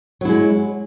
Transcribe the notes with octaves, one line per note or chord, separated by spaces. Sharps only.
F#3 G#3 E4